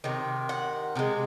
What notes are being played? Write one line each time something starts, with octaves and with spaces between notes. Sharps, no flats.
C3 D#3
F#5
C3 F3 G#3